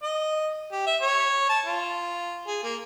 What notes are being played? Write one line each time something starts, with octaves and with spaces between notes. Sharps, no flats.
D#5
G4
E5
C#5
A5
F4
G#4
A#3